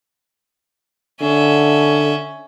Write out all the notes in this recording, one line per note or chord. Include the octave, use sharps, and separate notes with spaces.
D3 C#4 E5